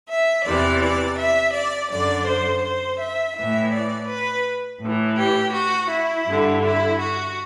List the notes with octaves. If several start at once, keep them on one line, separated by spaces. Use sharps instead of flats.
E5
E2 C3 E3 D5
D5
E5
D5
F#2 D3 D5
C5
C5
E5
A2 E3 E5
D5
B4
A2 E3
G4
F#4
E4
G2 D3
E4
F#4